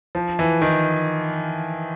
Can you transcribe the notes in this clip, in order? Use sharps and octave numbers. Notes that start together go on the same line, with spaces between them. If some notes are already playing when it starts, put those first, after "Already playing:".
F3
E3
D#3